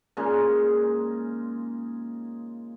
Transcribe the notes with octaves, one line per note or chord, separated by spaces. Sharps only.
A#2 C#3 G#3 D#4